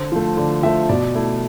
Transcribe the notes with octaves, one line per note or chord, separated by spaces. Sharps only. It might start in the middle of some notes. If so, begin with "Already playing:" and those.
Already playing: D3 C5
F3 A3
D3 D5
F3 A3 E5
B2 D5
A3 E4